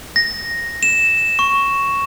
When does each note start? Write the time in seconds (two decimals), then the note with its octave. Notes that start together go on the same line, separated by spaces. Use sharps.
0.16 A#6
0.83 E7
1.39 C#6